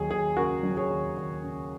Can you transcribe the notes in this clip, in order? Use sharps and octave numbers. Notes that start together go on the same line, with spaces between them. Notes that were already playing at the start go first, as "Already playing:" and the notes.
Already playing: D#2 F#3 G#4
D#2 G#4
C#3 F#4 A#4
F#3
G#4 C#5
D#2
D#2
C#3